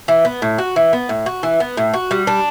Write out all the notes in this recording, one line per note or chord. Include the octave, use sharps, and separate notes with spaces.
E3
B3
A2
F#4
E3
B3
A2
F#4
E3
B3
A2
F#4
G3
D4